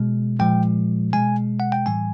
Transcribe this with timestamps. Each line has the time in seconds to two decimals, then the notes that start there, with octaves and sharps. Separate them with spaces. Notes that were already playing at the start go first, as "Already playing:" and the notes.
Already playing: B2 G#3
0.40 A#2 F3 G#3 G5
1.13 B2 G#3 G#5
1.60 F#5
1.72 G5
1.86 A2 E3 G3 G#5